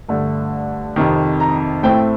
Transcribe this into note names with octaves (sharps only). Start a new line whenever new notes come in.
G2 D3 A3
F2 C3 D#3
A#5
A2 A3 C4 G5